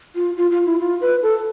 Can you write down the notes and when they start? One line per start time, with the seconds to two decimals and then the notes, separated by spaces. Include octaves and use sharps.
0.15 F4
0.36 F4
0.51 F4
0.66 E4
0.80 F4
1.01 B4
1.22 A4